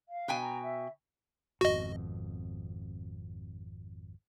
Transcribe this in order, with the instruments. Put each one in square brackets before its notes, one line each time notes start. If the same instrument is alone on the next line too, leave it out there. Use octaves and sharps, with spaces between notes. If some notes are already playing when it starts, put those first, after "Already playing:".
[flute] F5
[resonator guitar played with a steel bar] B2 G5 G#5
[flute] A#5
E5
[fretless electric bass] G#1 F2 B2 [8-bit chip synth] F#4 D#5